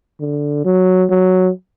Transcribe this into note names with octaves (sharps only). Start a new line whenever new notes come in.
D3
F#3
F#3